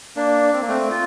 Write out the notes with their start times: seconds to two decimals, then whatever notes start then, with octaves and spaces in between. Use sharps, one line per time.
0.16 A#3 D4
0.53 C4
0.62 A#3
0.68 A3 C4
0.91 F4